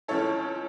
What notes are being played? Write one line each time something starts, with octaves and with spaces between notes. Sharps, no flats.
C#2 C#3 E3 A4 C#5